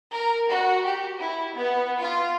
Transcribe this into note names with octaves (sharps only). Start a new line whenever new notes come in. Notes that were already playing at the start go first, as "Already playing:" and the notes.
A#4
F#4
G4
E4
B3
F4